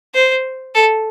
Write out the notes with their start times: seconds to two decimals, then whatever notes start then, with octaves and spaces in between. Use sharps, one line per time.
0.14 C5
0.75 A4